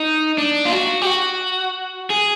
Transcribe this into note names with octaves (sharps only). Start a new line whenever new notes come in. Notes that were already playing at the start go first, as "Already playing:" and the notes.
Already playing: D#4
D4
F4
F#4
G4
F#4
G#4